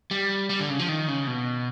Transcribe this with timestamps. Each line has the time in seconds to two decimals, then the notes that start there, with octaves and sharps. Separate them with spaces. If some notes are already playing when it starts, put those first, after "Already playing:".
0.11 G3
0.50 G3
0.60 D3
0.70 C#3
0.79 F3
0.88 D#3
1.08 C#3
1.27 B2